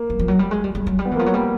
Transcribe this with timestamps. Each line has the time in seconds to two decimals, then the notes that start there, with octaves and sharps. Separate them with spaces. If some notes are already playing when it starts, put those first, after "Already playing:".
Already playing: A#3
0.10 F#3
0.19 F3
0.28 F#3
0.39 G3
0.51 G#3
0.64 G3
0.75 G3
0.87 F#3
0.99 G3
1.05 B3
1.11 E3
1.16 A#3
1.19 F3
1.26 F#3
1.34 G3 A#3